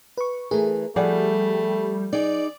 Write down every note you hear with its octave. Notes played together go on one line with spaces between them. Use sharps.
B4 C#6
E3 A3 G#4 A#4
F3 G3 A3 G#4 D5 F#5
D#4 G#4 D5